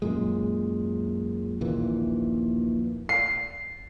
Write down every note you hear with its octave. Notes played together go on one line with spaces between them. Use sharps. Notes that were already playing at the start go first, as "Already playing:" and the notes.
F#2 A#2 G#3
A#1 D#2 A#2 E3
C7